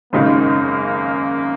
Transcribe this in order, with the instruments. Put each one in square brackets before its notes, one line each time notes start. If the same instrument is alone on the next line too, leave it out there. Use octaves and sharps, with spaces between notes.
[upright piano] G#1 F#2 C#3 G#3 D#4 [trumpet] A#3